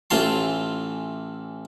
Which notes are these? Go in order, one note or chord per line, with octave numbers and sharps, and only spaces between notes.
A1 E3 F4 A5 C6